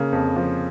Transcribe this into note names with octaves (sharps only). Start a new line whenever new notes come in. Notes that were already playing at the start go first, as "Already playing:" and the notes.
Already playing: C#3 A#3
F2
F3